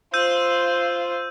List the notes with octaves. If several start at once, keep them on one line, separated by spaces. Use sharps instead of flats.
F4 C5 E6 G6 D#7